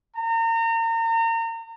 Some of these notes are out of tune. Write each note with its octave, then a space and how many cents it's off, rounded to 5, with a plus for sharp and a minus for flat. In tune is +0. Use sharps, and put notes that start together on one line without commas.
A#5 -35